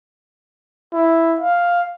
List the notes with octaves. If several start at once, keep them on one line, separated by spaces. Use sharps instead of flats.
E4
F5